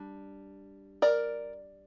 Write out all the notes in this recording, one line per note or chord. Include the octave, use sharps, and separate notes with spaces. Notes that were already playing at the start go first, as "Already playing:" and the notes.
Already playing: G3 D4
A#4 D5